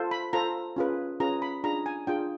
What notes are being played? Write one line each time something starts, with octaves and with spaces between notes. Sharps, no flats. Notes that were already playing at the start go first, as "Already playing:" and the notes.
Already playing: F4 A4 C5
B5
F4 A4 C5 A#5
C#4 F4 G#4 B4
C#4 F4 G#4 B4 A#5
B5
D4 F4 G#4 A#5
G#5
D4 F4 G#4 G5